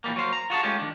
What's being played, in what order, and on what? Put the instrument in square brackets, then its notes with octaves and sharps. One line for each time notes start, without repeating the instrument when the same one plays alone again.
[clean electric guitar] A#2 E3 G3 A#3
F#3 A#3 C5 F5
A#5
F4 F#4 G#4 A5
G#3 A3 C#4 F4 G4
D#3 D4